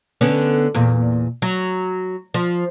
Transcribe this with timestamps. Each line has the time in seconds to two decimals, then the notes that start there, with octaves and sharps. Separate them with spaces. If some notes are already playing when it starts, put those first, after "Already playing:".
0.21 D3 B3 C#4
0.74 E2 A#2
1.42 F#3
2.34 F3